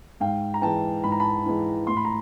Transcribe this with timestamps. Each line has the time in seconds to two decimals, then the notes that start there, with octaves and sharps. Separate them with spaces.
0.20 G#2 F5 G5
0.54 A#5
0.62 E3 G#3 G5 A5
1.04 G#2 B5
1.12 A#5
1.20 A5 B5
1.46 E3 G#3
1.87 A2 C6
1.97 B5
2.05 A#5